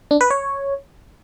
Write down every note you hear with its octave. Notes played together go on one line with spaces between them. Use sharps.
D4
B4
C#5